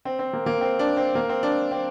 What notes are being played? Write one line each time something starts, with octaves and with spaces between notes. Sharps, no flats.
C4
C4
A#3
A#3
C4
D4
C4
A#3
C4
D4
C4